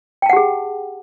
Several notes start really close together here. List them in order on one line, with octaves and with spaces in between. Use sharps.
G5 A5 F#5 G4 G#4